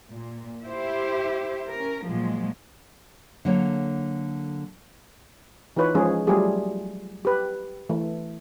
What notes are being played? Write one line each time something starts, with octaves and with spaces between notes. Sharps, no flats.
A#2
E4 G4 C5 E5
C#4 A#4
A#2 F3 F#3 G#3
D3 F#3 A#3 A4 C#5
E3 D#4 F4 B4 C#5
F3 G#3 C#4 G#4
F#3 G3 A3 F4 G4 G#4
G4 B4
E3 A3